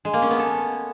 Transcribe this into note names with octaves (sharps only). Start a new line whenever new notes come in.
G#3
A#3
C#4
B3
A4